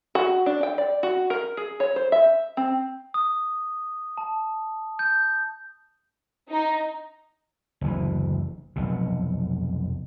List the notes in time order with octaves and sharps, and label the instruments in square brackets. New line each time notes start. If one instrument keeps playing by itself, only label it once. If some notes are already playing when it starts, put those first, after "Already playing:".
[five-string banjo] F#4
D4
G5
D5
F#4
A#4
G#4
C#5
C5
E5
C4
[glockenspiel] D#6
A5
G6
[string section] D#4
[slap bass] F#1 D2 A2 E3
F1 B1 B2